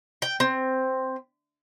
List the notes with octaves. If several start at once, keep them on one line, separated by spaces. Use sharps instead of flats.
G5
C4